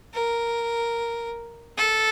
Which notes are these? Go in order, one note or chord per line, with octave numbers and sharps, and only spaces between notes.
A#4
A4